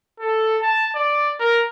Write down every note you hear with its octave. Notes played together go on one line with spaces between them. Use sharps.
A4
A5
D5
A#4